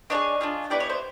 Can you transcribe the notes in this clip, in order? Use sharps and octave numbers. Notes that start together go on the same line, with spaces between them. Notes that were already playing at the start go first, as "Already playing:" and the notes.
D4 F4 G#4 C#5 D#5
D4 F4 G#4
B3 E4 G4 D5
C#5
C5